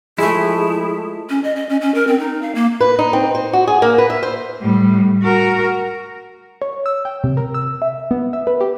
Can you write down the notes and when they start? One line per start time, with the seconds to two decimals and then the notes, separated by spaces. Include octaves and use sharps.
0.18 F3 G#3 A3 E4 G#4
1.30 C#4
1.44 D#5
1.56 D#5
1.69 C#4
1.81 C#4
1.94 A#4
2.07 C4
2.19 D#4
2.42 F5
2.55 A#3
2.81 B4
2.99 D#4
3.13 C4
3.35 C5
3.53 F#4
3.67 G#4
3.82 A#3
3.98 B4
4.10 E5
4.23 C5
4.62 A2 G3
5.22 F#4 A#4
6.62 C#5
6.86 E6
7.05 G5
7.24 C3
7.37 A#4
7.54 E6
7.82 E5
8.11 B3
8.33 E5
8.47 B4
8.61 G4